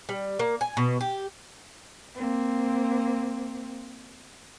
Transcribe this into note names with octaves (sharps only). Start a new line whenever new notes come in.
G3
A#3
G#5
B2
G4
A#3 C4